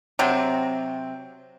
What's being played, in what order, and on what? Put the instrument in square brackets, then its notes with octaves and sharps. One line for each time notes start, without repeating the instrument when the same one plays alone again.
[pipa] C3 F#3 C4